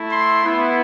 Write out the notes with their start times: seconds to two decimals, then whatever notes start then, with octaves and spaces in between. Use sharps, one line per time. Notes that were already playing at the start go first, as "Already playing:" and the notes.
Already playing: A3 E4
0.10 C6
0.44 B3 E4